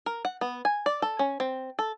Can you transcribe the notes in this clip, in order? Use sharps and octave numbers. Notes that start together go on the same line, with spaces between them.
A#4
F#5
B3
G#5
D5
A4
C#4
C4
A4